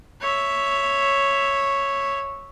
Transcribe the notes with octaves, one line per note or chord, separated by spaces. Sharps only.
C#5 E5